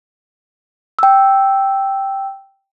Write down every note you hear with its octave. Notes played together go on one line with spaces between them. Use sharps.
G5 E6